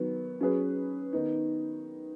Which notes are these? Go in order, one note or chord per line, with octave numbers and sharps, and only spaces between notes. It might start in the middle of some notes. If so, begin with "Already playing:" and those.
Already playing: D#3 F#3 B3
F#3 C#4 G#4 B4
D#3 B3 D#4